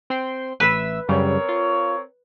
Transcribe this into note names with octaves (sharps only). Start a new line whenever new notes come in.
C4 G5 C6
A1 B4 E5 E6
F#2 C#3 G3 C4 A#4 C#5
F4